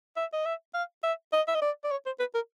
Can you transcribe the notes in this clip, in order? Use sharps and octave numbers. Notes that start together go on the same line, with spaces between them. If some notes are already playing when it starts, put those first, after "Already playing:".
E5
D#5
E5
F5
E5
D#5
E5
D#5
D5
D5
C#5
C5
B4
A#4